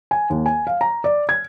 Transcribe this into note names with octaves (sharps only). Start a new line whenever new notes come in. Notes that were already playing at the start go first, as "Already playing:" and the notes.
G#5
D#2
G#5
F5
A#5
D5
G#6